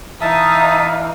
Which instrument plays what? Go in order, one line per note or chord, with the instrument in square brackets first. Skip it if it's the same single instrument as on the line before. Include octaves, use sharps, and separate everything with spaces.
[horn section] E3 F5 [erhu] D#4 [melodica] E5 A5 D#6